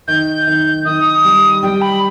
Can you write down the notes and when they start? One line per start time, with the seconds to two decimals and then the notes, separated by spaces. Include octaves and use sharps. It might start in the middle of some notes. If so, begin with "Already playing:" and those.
0.08 D#3 G6
0.47 D#3
0.85 D#3 D#6
1.24 G3
1.63 G3 G5
1.82 B5